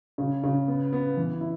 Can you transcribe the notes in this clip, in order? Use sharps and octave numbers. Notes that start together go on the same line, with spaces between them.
C#3
C#3
B3
B3
E3
E4